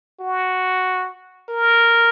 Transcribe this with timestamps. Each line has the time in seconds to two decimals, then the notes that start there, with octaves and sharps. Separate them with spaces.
0.20 F#4
1.49 A#4